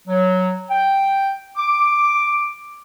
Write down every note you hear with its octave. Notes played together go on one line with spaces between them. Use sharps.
F#3
G5
D6